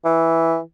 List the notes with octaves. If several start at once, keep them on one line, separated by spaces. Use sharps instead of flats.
E3